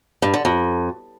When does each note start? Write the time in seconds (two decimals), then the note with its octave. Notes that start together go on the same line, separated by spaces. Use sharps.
0.22 G2
0.34 D3
0.45 F2